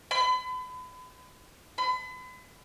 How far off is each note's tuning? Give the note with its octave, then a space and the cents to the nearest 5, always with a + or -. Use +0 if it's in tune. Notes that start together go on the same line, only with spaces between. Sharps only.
B5 +40
B5 +40